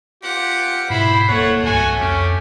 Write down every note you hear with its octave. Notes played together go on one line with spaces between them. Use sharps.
F4 G4 F#5
G#2 B2 E4 C5 B5
D1 A3 A#3 C#5 F#5
C2 G2 F#4 G#5
F2 C#4 G4